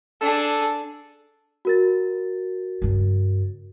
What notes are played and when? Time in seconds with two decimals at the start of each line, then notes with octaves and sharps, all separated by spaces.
0.21 D4 G#4 A4
1.65 F#4 A#4 A6
2.82 G2 C#3